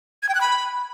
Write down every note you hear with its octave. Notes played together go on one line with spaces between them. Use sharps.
G#6
G5
F#6
B5